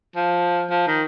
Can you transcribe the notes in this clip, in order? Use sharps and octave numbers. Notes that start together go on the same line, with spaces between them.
F3
F3
D#3